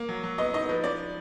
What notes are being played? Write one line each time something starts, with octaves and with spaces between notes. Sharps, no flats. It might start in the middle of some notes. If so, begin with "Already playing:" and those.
Already playing: A#3
F#3
F#3
B3 D#5
D#4 D#5
F3 B4
F3 D5